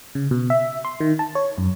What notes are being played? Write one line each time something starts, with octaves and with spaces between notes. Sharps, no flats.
C#3
B2
E5
C6
D#3
A5
C#5
F#2